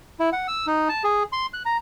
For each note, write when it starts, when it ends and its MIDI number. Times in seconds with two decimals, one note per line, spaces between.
0.20 0.30 64
0.32 0.47 78
0.48 0.66 88
0.67 0.88 63
0.89 1.03 81
1.04 1.23 68
1.32 1.46 84
1.54 1.63 90
1.65 1.77 82